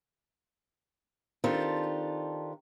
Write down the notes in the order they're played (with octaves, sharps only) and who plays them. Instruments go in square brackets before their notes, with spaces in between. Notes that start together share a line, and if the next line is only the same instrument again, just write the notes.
[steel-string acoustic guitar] D#3 C4 D4 F4 G4 A4